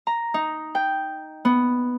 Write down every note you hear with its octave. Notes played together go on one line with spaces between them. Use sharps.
A#5
D#4
G5
B3